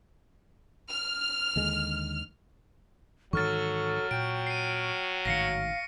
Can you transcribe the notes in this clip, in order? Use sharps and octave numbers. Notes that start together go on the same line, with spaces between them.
F6
D#2 D3 G#3
G#2 D#3 E3 F#3 A4 C#6 F6 A6
A#2 G5 D7
C7 D#7
A1 G#2 D#3 F5 A#6 C7 C#7